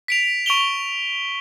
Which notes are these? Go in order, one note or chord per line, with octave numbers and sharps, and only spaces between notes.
B6 D7 F7
C#6 D7 F7 G7